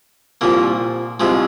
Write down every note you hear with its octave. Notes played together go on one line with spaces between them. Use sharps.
C2 A#2 F3 A#3
C2 C3 F3 G#3